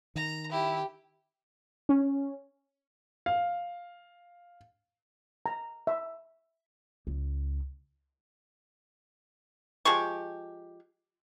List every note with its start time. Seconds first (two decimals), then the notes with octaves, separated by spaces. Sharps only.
0.16 D#3 A#5
0.51 E4 G4
1.89 C#4
3.26 F5
5.46 A#5
5.87 E5
7.07 C#2
9.85 F3 G#3 G4 C#6